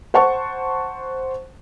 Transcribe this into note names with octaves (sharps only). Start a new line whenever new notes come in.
C5 F#5 A5 C#6